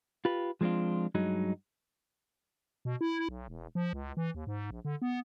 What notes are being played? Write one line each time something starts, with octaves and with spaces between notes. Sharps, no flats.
F4 G4 B4
F3 G#3 C4 D4 F4
G2 F#3 G#3 D#4
B2
E4
B1
E1
F3
C#2
E3
D#2
G#2
A#1
D3
B3